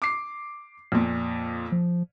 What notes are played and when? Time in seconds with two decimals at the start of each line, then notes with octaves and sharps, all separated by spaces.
0.02 D6 C7
0.92 F2 A#2
1.72 F3